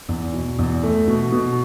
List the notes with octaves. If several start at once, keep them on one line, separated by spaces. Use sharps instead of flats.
E2
B2
E2
A3
B2
B2